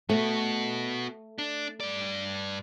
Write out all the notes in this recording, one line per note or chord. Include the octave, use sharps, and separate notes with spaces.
A3 B3 F#4
D4
G2 D5